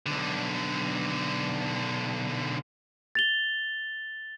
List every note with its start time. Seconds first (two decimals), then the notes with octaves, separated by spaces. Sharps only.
0.06 B1 D3
3.15 A6 F7 G7